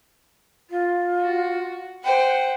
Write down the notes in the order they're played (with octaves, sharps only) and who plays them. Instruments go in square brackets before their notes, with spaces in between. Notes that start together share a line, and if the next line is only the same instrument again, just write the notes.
[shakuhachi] F4
[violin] F#4
[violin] C5 F#5 [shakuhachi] G5